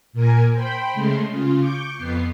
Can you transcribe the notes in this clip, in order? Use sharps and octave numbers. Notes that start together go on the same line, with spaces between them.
A#2 A#4 G#5
C5 G5 B5
C#3 G#3 A3 C6
C#3 F4
C#6 D6 G6
F2 B3 C7